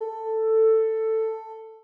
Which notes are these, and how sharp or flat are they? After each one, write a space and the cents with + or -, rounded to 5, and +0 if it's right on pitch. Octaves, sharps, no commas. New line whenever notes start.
A4 +10